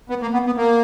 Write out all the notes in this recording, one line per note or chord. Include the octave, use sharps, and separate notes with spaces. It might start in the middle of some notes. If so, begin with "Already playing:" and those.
B3
A#3
B3
B3
A#3